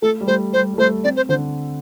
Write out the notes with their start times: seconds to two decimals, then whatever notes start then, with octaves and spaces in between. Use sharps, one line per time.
0.02 A3 A4
0.21 G3
0.27 A3 C5
0.53 G3 C5
0.74 G3
0.78 A3 C5
1.04 C4 D5
1.17 C5
1.29 D3 C5